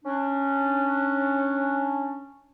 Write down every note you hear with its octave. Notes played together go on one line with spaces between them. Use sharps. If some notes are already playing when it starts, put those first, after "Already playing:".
C#4 D4